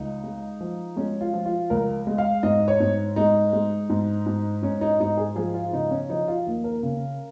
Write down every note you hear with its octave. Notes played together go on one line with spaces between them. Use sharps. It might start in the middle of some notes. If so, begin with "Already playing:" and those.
Already playing: C#2 D#4
G#3
F3
G#3 C#4
F4
F3
F4
C#2 A#4
G#3
F5
G#2 D#5
C#5
G#2
G#3 D#4
G#3
G#2
G#2
G#2 C#4
D#4
G#2 D#4
G#4
F3 G#4
F4
C#3 D#4
C#4
F3 D#4
F4
D#2
A#4
C#3